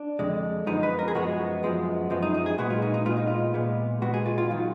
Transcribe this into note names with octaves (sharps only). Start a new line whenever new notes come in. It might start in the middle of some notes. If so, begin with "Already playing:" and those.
Already playing: D4
F2 D3 G#3
F#2 F3 G#3 B3 D#4
B4
A#4
G#4
F#2 F3 G#3 B3 F#4
F#2 F3 G#3 B3
F#2 F3 G#3 B3
D#4
D#4
G#4
A#2 G#3 B3 F#4
F4
D#4
D#4
A#2 G#3 B3 F4
D#4
F4
A#2 G#3 B3
A#2 G#3 B3 F#4
G#4
F4
F4
D#3 F#3 F4